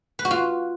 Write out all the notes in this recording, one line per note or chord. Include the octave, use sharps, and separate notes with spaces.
B4
F#4
F4